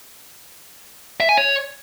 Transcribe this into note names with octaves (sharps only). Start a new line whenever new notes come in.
E5
G#5
C#5